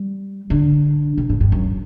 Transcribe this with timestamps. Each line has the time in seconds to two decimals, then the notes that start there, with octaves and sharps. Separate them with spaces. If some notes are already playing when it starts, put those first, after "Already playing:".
Already playing: G3
0.50 D3
1.18 B2
1.29 A2
1.40 G2
1.52 F#2